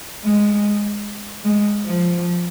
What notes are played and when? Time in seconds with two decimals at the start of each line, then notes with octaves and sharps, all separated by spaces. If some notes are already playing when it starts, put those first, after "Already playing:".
0.24 G#3
1.44 G#3
1.85 F3